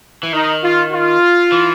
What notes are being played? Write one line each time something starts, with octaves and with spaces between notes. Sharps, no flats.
E3
D#3 D#4
F4
F4
E3